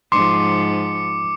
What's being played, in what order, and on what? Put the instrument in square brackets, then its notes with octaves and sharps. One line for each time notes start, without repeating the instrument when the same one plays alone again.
[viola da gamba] G#2 F3 [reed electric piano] C6 [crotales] D6 C#7